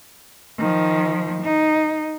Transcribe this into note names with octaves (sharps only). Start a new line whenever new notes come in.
D#3 F3
D#4